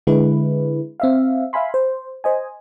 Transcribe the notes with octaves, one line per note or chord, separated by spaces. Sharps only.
D3 G#3 E4 B4
C4 E5 F5
E5 F5 G#5 B5 C6
C5
C5 D#5 G#5